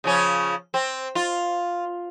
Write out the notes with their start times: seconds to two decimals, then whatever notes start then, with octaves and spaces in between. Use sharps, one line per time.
0.04 C#3 F3 C#4
0.74 C4
1.15 F4